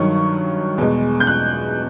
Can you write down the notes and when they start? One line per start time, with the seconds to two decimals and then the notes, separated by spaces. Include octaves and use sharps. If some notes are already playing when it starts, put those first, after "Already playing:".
Already playing: G2 D#3 F#3 C#6
0.78 E2 B2 G#3
1.20 G6
1.27 F#6